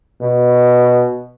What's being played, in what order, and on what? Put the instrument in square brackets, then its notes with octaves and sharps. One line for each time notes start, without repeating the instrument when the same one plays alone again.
[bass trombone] B2